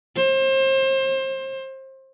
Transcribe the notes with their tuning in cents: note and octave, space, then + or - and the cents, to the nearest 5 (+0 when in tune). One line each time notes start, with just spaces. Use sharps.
C5 +30